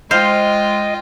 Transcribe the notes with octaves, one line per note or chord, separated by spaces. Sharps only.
G#3 F4 C5 D#5 F5 G5